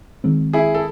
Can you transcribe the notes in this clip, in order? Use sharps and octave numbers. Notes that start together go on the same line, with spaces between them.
D#3 G#3 C4
E4 G#4
A4